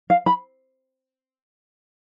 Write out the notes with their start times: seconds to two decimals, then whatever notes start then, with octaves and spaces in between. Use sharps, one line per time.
0.10 F5
0.26 B5